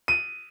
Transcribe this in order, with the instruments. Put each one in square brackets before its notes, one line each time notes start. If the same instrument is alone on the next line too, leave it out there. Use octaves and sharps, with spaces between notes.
[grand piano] D#7